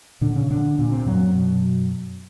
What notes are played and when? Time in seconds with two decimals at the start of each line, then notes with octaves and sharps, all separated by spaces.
0.21 A#2 D3 D4
0.35 C#3 C#4
0.50 D3 D4
0.79 A#2
0.92 C3 C4
1.06 F#2 F#3
1.35 B2